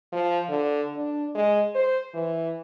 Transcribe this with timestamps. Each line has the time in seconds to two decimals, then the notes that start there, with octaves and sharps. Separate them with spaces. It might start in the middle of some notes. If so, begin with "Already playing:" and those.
0.12 F3
0.49 D3
0.96 D4
1.35 G#3
1.75 C5
2.14 E3